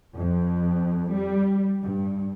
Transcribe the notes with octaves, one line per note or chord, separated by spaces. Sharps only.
F2
G3
G2